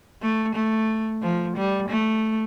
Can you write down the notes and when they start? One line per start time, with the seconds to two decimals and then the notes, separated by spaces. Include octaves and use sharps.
0.22 A3
0.55 A3
1.23 F3
1.57 G3
1.89 A3